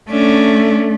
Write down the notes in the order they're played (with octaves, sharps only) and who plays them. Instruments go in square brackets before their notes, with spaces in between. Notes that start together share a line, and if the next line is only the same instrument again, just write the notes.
[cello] A3 [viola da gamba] C#4 D4